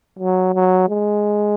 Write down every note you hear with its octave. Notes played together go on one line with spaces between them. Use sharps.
F#3
F#3
G#3